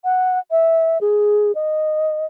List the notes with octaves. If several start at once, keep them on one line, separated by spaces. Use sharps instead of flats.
F#5
E5
G#4
D#5